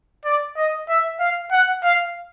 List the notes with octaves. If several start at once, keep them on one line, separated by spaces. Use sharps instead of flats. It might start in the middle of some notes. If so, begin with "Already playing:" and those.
D5
D#5
E5
F5
F#5
F5